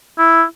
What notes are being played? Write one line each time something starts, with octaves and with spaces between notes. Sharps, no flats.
E4